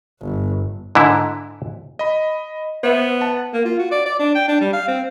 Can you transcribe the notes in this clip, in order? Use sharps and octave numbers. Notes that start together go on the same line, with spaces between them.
G1
G#2 D3 E4
D#5 B5
B3 C5 E5
F#5 A5
A#3
F4
F#4
D5
D5
D4
G5
D4
G3
F5
C4